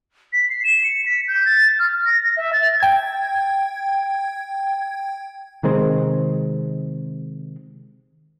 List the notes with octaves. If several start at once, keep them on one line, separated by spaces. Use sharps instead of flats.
B6
C7
E7
C#7
B6
G6
A6
F6
A#6
A#6
E5
A6
G5 G#6
C3 D#3 G#3 C4